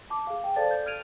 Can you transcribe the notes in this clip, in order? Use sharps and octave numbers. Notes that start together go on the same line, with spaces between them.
A5 D6
G#4 F5
G5
A4 C5 D5 F5 A5 A6
G6
F6 G#6 D7 D#7 F7